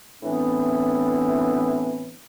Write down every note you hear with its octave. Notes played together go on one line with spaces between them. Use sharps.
A2 E3 B3 C4 D4